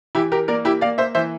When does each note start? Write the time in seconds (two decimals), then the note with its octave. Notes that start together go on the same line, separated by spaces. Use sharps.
0.15 E3 E4 G4
0.32 G4 A#4
0.48 A#3 A#4 D5
0.65 E4 G4
0.81 A#3 D5 F5
0.98 C5 E5
1.15 E3 C5 E5